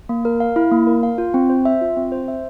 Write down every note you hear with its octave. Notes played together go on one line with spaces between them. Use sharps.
A#3
A#4
F5
E4
A#3
A#4
F5
F4
C4
C5
E5
F4
C4
C5
E5